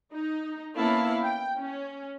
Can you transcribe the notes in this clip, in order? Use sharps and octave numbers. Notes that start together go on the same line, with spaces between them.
D#4
A#3 B3 C#4 E4 F5 A5
G5
C#4